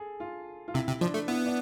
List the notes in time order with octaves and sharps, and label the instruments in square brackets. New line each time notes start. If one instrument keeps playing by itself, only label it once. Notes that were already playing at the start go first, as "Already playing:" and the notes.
Already playing: [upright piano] G#4 A4
F4
F4
[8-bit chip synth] C3 [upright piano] E4
[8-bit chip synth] C3
[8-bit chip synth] F3 [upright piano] D4
[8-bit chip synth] A3
[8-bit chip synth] B3 [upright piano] E4
[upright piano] D4